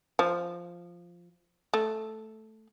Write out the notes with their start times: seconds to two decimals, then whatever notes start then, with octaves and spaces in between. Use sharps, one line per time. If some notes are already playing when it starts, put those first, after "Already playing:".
0.19 F3
1.74 A3